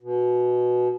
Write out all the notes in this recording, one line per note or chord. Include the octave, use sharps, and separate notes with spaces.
B2